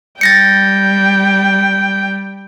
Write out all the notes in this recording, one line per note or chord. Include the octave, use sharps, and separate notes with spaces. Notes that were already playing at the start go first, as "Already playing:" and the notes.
G3 G5 A6 A#6 C#7